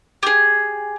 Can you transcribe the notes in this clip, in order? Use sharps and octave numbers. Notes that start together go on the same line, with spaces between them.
G4 G#4